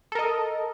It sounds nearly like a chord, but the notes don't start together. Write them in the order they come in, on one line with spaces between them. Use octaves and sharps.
A4 A#4 D#5